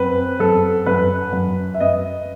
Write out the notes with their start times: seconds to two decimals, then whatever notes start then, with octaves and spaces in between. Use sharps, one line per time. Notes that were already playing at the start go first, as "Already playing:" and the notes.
Already playing: F#2 C4 B4
0.40 F#2 A4
0.86 F#2 B4
1.33 F#2
1.74 E5
1.80 F#2 B4 D#5